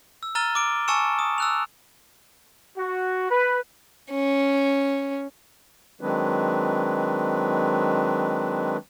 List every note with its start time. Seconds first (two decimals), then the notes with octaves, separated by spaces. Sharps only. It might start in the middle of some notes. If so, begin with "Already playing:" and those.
0.23 E6
0.35 A#5 E6 F6 A6 D#7 G7
0.55 D6 D7
0.88 G#5 A5 C#6 E6 C#7 E7
1.19 D#6
1.38 E6 F#6 F7
2.78 F#4
3.30 B4
4.12 C#4
6.01 D#3 F#3 G#3 C4 D4 B4